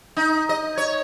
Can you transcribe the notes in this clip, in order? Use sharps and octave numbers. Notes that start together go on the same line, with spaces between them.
D#4
D#5
C#5